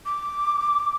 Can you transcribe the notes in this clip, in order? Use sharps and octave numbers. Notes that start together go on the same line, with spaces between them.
D6